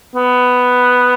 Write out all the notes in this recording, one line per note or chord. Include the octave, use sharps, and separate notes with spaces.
B3